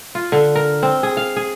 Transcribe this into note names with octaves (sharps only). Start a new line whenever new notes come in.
F4
D3
A#4
C4
G#4
F5
G#4